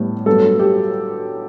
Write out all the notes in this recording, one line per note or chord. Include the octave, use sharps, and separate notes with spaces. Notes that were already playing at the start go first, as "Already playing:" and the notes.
Already playing: A2 G3 B3
G2 F#3 B3 A4
G4